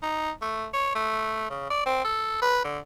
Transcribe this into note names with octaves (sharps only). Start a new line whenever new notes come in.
D#4
A3
C#5
A3
C#3
D5
C4
A4
B4
D3